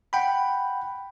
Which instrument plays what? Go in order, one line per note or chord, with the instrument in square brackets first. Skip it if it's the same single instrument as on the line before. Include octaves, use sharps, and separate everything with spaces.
[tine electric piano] F#5 G5 B5